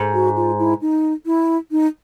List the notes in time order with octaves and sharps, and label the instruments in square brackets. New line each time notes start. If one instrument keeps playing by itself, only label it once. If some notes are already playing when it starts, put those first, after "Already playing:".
Already playing: [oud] G#2
[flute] F#4
F4
E4
D#4
E4
D#4